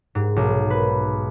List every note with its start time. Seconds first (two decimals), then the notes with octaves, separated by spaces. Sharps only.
0.15 G#2
0.36 B1
0.70 B4